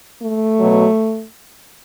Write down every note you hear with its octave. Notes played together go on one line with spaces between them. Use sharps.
A3
B2 F#3